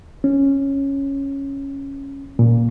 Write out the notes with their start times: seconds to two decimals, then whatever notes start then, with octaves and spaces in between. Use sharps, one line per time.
0.24 C#4
2.39 A#2